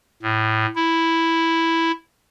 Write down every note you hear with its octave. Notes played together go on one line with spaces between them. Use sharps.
A2
E4